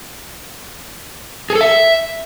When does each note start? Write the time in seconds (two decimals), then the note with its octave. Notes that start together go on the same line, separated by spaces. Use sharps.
1.50 G#4
1.55 A4
1.61 E5